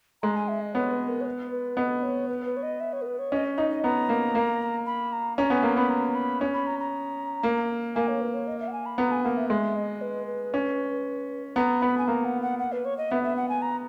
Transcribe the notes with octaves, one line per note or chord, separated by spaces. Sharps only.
G#3 A#5
G#5
E5
D#5
B3 C#5
B4
A#4
C#5
B4
B4
B3 D#5
C#5
B4
B4
C#5
D#5
E5
C#5
A#4
B4
C#5
C#4 D#5
D#4 D#5
D#5
B3 A#5
A#3
A#3
B5
A#5
C#4 A#5
B3 G#5
A#3 A#5
B3 B5
A#5
B5
C#4
B5
A#5
A#5
A#3
A#3 G#5
C#5
B4
C#5
D#5
E5
F#5
G#5
B5
B3 A#5
G#5
A#3 F#5
E5
G#3 E5
D#5
B4
B4
C#4
B3 A#5
B3 B5
G#5
A#3 A#5
F#5
F#5
F#5
B4
C#5
D#5
B3 E5
E5
F#5
G#5
A#5